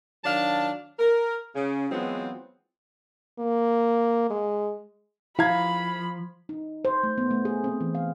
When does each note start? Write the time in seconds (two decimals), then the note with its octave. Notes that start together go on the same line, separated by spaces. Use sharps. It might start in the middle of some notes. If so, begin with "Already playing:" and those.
0.24 D#3 F#3 D4 F5 A5
0.99 A#4
1.56 C#3
1.90 E3 F#3 G#3 B3 C4 F4
3.40 A#3
4.30 G#3
5.39 F3 E4 F5 A#5 B5 G#6
6.49 D#4
6.85 C5
7.03 A3
7.18 B3
7.31 A3
7.45 G#4
7.64 C4
7.81 E3
7.95 F5